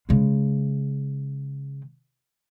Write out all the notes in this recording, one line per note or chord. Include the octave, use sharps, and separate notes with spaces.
C#3 G#3